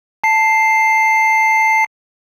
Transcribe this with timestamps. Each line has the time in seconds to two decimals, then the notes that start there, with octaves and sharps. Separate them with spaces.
0.24 A5 C7